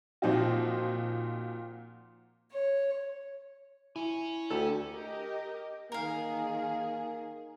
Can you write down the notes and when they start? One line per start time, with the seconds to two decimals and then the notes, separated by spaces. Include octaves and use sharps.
0.22 A#2 F3 C4 D#4 F#4
2.52 C#5
3.96 E4 C#5 G#5
4.50 D2 G4 A4
4.90 G4 A#4 D#5
5.92 D#3 A#3 G#4 A#4 F5